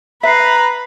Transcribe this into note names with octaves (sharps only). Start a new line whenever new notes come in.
B4 E5 A#5 B6 C7